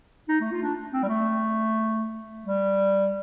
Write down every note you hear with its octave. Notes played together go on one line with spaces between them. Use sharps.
D#4
A3
F4
D4
C4
G3
A3
G3